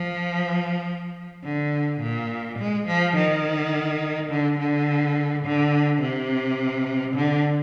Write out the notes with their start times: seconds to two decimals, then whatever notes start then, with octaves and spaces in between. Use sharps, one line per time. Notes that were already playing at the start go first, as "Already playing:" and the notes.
Already playing: F3
1.44 D3
2.01 A#2
2.58 G#3
2.87 F3
3.16 D#3
4.30 D3
4.59 D3
5.45 D3
6.01 C3
7.16 D3